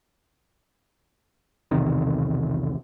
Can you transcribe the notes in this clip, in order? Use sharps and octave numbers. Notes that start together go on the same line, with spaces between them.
B1 E2 C3 D#3